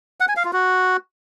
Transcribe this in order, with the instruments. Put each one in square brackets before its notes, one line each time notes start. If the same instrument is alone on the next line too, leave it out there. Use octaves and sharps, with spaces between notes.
[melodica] F#5
G#5
F5
F4
F#4